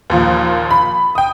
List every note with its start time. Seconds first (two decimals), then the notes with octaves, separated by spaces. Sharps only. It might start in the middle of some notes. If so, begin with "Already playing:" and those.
0.10 D#2 A#2 F3
0.71 B5
1.15 G5 D#6